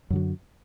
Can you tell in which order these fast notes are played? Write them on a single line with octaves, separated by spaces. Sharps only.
F#2 D3 F#3